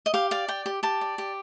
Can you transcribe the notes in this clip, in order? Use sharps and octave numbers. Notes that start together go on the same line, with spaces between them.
D#5
G4 F5
D5 F5
G4 G5
G4
G4 A5
D5
G4